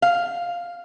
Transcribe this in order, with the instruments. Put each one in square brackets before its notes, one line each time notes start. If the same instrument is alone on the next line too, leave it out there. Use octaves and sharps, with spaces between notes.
[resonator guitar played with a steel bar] F5